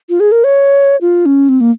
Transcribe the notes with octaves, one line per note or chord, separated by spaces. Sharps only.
F4
G#4
A#4
C#5
F4
C#4
C4
A#3